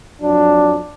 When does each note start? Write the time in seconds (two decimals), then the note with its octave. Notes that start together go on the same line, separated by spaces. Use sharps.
0.22 F2 F#3 D4